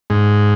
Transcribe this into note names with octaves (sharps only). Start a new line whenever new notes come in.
G#2